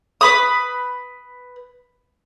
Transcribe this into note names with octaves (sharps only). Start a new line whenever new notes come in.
B4 B5 D#6